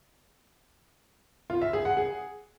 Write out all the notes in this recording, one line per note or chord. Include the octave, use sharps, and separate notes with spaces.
F4
E5
G#4
F#5
G#4